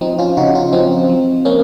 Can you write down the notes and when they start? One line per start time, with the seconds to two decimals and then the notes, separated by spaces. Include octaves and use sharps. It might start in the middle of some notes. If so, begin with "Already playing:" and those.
0.01 F3 C4 D#4
0.19 C#4 F4
0.37 C#3 D#4 F#4
0.55 C#4 F4
0.72 F3 C4 D#4
1.09 F3
1.45 A#3 C#4